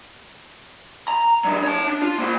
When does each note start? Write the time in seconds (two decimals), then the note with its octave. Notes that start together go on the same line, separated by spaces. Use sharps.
1.08 A#5
1.44 F#3 D4
1.63 C#5 A5
1.87 D4
2.02 F4
2.18 A#3 C5